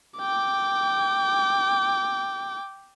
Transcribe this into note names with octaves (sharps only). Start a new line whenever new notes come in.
G5 D6